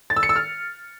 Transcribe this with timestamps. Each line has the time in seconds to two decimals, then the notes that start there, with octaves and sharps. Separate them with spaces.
0.10 A6
0.16 E6
0.23 C#7
0.29 E6
0.36 F6